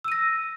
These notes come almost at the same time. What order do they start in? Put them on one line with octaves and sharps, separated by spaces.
E6 D#7 A#6